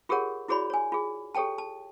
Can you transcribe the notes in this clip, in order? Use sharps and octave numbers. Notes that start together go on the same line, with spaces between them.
F4 G4 G#4 A#4 C#5 F#5
E4 F#4 G#4 C#5 D5 B5
C#5 G#5
F4 G#4
G4 A4 C#5 G5 A5
A5